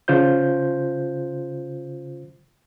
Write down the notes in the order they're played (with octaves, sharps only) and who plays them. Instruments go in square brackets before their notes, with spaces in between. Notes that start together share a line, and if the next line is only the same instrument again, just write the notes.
[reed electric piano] C#3 F4 C5 G6